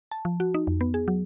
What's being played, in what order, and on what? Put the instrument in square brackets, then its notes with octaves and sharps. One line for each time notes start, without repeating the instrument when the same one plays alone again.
[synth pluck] A5
F3
F#4
D#4
F2
B3
G#4
F#3